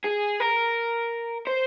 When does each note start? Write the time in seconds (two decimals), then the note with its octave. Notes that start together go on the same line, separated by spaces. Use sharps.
0.04 G#4
0.40 A#4
1.47 C5